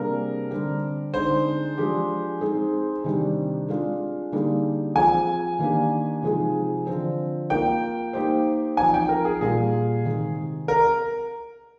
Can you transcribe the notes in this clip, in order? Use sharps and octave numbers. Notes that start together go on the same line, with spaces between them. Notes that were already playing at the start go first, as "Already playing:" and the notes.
Already playing: C3 G3 A#3 D4 G#4 A#4
D3 G3 C4 G4
D3 G#3 C4 D#4 C5
F3 G#3 D4 G4
G#3 C4 D#4 G#4
C3 D#3 G3 D4
G#3 D4 F4
D3 G3 A#3 D#4 G#4
F3 C4 F4 G#4 C5 G#5
D#3 A#3 D4 G4
C3 F3 G#3 D#4 G#4
D3 F3 C4
A#3 F4 A#4 G5
A#3 D#4 G4 C5
F3 C4 D#4 G#5
G5
A#4
G#4
A#2 G3 A#3 F4 G#4
C3 D#3 G#3
A#4